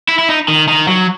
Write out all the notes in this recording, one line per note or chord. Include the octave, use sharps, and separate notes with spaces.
E4
E4
D#4
D#3
D#3
F#3